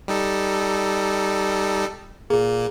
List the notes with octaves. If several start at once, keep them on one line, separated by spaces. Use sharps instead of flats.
G3 D#4 A4
A#2 A#3 G#4